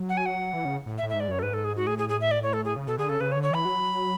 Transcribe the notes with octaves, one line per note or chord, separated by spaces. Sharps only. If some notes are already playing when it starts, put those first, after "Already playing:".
Already playing: F#3
F#5
G#5
F#5
E3
C#3
A2
E5
A2
E5
G#2
D5
F#2 C#5
A4
G#2 B4
A4
G#4
F#4
A2 G#4
G#4
G#4
E5
D5
C#5
A4
G#4
C#3
B2 A4
D3 G#4
C#3 A4
C#3 B4
C#5
D3
C#5
E3 B5
F#3